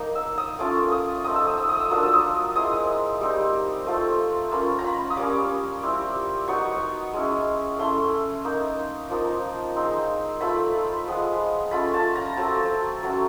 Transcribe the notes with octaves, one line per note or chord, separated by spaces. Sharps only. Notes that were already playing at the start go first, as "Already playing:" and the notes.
Already playing: A#3 D#4
E6
D#6
A3 C#4 F4 D6
D#6
A3 C4 D#4 D#6
E6
D#6
E6
D#6
E6
F#3 A#3 D4 F4 D#6
E6
D#6
G#3 C4 E4 D#6
G3 C4 D#4
A3 C4 F4
A#3 C#4 F4 B5
A#5
B5
D#6
G3 A#3 C#4 D6
G3 C4 E4
F#3 B3 D#4 C#6
G#3 C#4 E4
A3 C#4 E4 C6
A#3 D#4
F3 A#3 D#4
G#3 C4 D#4
A3 C4 F4 B5
F3 G#3 B3
A3 C#4 F4 B5
A5
A#5
F#3 A3 C4 A5
F#3 A3 C#4